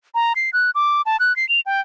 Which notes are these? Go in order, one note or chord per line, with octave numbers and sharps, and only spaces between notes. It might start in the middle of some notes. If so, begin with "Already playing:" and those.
A#5
C7
F#6
D6
A5
F#6
C7
F7
G5